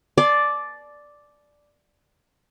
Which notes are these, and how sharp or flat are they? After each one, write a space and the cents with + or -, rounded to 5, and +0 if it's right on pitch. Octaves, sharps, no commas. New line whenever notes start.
D5 +0 A5 -40 C6 +0